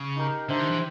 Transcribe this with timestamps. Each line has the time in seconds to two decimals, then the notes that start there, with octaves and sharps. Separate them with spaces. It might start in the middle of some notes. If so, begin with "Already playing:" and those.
Already playing: C#3
0.16 D#4 G4 A#4
0.49 D3 D4 G4 C5 E5
0.60 D#3
0.71 E3